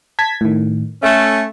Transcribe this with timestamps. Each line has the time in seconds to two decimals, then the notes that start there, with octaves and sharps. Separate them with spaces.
0.19 A5 G#6 B6
0.41 A2 D#3
1.03 A3 C#4 E5